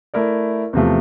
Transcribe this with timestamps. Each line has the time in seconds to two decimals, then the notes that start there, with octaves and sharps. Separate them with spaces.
0.14 A3 E4 A#4 D5
0.73 E2 C3 F3 A3